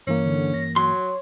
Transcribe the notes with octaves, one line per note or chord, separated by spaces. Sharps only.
G2 E3 A#3 C#4
D3
A#6
F#3 C#5 C6